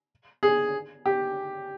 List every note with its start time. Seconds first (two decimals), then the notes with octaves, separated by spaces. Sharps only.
0.43 G#4
1.06 G4